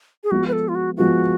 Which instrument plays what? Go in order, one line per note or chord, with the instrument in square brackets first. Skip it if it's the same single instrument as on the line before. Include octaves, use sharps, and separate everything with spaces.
[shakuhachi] G#4
[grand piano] F3 G#3 B3 F4 [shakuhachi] F#4
[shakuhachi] B4
A4
F4
F#4
[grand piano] F3 G#3 B3 F4 [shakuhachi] F#4